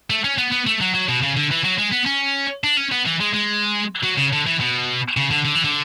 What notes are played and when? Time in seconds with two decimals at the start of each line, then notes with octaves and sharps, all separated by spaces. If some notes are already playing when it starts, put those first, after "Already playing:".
0.10 A3
0.24 C#4
0.38 B3
0.52 B3
0.67 A3
0.81 F#3
0.95 F#3
1.08 B2
1.23 C#3
1.37 D3
1.51 E3
1.65 F#3
1.79 G#3
1.92 B3
2.07 C#4
2.64 D4
2.77 C#4
2.91 B3
3.06 E3
3.20 G#3
3.34 G#3
4.04 F#3
4.18 C#3
4.33 D3
4.46 E3
4.60 B2
5.17 C#3
5.31 D3
5.45 D3
5.55 E3
5.64 D3